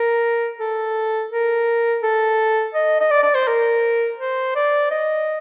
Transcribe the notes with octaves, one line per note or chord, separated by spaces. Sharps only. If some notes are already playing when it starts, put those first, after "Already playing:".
Already playing: A#4
A4
A#4
A4
D#5
D#5
D5
D5
C5
A#4
C5
D5
D#5